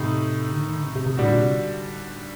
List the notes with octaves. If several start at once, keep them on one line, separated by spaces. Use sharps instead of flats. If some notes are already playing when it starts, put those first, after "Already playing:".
Already playing: A2 C3 A3 D#4
D3
D#3
D3
C3
C3
C3
A2 D3 G3 D4 F#4
A#2
C3